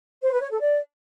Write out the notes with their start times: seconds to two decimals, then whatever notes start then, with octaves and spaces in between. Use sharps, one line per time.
0.23 C5
0.32 B4
0.41 C#5
0.51 A4
0.60 D5